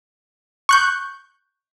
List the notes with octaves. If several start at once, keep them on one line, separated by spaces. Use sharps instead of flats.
C#6 F#6 G6